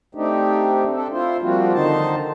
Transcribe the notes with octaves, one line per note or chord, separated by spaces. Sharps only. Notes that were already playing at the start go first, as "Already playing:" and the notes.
A3 C4 D4 D#4 G4
C4 D4 A4
E4 F4 C5
F3 G3 A#3 C4 F4 F#4
D3 D#3 D#4 C5 A5